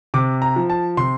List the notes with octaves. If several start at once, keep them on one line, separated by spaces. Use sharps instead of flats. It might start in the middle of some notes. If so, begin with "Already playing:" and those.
C3 D6
A#5
F3
A5
C3 C6